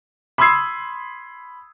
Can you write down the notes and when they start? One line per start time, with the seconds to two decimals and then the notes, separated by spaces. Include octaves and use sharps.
0.38 B5 C6 D#6 E6 G#6 C7